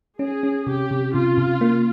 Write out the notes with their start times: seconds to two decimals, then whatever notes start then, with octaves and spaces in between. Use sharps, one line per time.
0.19 C#4 G#4
0.43 C#4
0.67 C3 G4
0.91 C3
1.14 C3 F4
1.38 C3
1.61 A#3